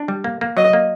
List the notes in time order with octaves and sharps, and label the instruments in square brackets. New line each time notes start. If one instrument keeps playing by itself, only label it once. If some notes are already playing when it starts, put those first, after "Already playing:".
Already playing: [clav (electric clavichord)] D4
G3
A#3
A#3
[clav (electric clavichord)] F#3 [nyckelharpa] D#5
[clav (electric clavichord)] A#3